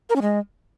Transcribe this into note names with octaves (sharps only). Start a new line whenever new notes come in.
A#4
C#4
G#3